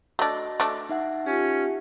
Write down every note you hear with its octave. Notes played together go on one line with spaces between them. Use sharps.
A3 D4 F#4 D#5 A#6
A3 D4
D#4 E5 F#5
C#4 F4 G4